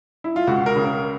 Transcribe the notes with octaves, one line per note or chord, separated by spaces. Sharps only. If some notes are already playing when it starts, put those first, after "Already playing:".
E4
F4
C#2 F#4
A#4
C#3
A#4